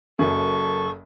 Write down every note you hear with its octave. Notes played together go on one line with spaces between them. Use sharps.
F#1 F#2 A4 C#6